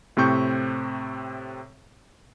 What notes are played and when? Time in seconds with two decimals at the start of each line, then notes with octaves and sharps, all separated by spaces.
0.17 A2 C3 C4 C#6 G6